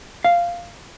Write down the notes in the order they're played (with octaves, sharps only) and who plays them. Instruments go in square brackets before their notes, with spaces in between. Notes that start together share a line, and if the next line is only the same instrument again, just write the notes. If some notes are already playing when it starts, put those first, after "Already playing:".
[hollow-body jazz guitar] F5